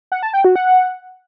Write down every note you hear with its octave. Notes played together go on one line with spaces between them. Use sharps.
F#5
A5
G5
F#4
F#5